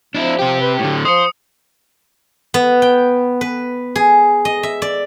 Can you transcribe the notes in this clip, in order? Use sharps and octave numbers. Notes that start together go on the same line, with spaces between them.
F3 D4 E4
C3 G4
B4
A2 D3 G4
F3 C5 D#6 C#7
B3
G5
B4
G#4
D#5
E5
D5